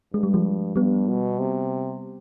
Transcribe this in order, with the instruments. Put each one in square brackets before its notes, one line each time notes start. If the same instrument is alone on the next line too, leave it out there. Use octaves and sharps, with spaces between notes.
[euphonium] G2 [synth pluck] G#3
[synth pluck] G3
F3 G#3
[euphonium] G2 [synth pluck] G3 B3
[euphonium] B2
C3